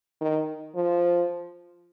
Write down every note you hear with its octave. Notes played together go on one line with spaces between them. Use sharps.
D#3
F3